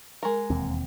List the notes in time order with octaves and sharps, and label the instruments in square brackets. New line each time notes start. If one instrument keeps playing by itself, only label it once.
[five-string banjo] G#3 A#4
[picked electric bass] E1 D#2 C4